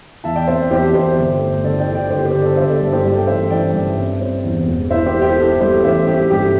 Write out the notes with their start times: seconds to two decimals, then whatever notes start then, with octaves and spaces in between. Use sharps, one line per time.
0.24 E2 E5 A5
0.36 D5 G5
0.47 C4 C5 E5
0.70 E2 G4 C5
0.94 E2 G4 C5
1.17 G1
1.41 A3
1.64 D3 A4 D5
1.80 D5 G5
1.87 D3
1.95 D5 G5
2.10 G1 G4 C5
2.26 G4 C5
2.34 D3
2.42 A4 D5
2.57 G1 C5 E5
2.69 A4 D5
2.80 G2 A4
2.92 G4 C5
3.04 G2 A4 D5
3.18 G5
3.27 A1 C5 E5
3.50 E3 D5 G5
3.74 G2
3.97 C4
4.21 C4
4.44 E2
4.67 E1
4.90 E4 C5 E5
5.06 G4 C5
5.14 E4
5.22 G4 C5
5.37 E4 A4
5.60 G3 G4 C5
5.83 A1 C5 E5
6.07 A3 G4
6.30 G2 G4